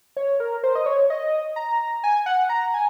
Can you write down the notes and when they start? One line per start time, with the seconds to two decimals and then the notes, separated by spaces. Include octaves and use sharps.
0.17 C#5
0.40 A#4
0.64 C5
0.75 D#5
0.86 C#5
1.10 D#5
1.56 A#5
2.04 G#5
2.26 F#5
2.49 A#5
2.74 G#5